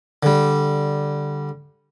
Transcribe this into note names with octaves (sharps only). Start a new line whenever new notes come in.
D3 G3